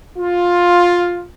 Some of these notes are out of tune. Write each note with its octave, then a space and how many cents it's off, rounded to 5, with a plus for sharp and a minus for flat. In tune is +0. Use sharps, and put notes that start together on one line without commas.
F4 +10